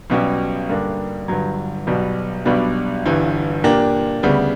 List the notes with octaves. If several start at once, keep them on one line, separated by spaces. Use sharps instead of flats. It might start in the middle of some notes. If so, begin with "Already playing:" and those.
B1 B2 G3 C#4 G4
G2 D3 A#3 D4 G4
G1 G2 F#3
B1 B2 G3
B1 B2 G3 B3 D4
G1 G2 E3
A#2 A#3 D4 G4
D2 C#3 G3 B3